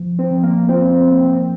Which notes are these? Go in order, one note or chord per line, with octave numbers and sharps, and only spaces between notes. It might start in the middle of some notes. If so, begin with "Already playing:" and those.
Already playing: F3
C4
F3
A#3
C4 F4
A#3